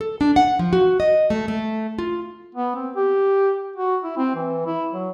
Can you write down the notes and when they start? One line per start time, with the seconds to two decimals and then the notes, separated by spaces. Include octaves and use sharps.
0.01 A4
0.21 D4
0.36 F#5
0.59 F3
0.73 F#4
1.00 D#5
1.30 A3
1.48 A3
1.99 F4
2.55 B3
2.76 C4
2.96 G4
3.76 F#4
4.04 E4
4.17 C4
4.35 E3
4.66 E4
4.93 F#3